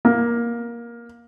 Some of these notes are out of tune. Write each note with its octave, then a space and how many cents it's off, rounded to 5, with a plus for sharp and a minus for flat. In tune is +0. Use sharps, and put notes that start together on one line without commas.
A#3 +15